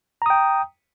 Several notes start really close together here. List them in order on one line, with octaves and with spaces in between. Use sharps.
A#5 D#6 G5